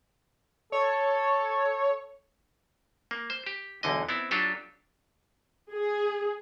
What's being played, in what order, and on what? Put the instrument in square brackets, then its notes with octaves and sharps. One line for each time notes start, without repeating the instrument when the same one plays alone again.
[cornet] A4 [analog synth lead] C#5
[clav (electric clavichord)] A#3
C5
G4
B1 E2 D3 D#5
B3 C4 E4
F#3 D4 F4 G4 A4
[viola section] G#4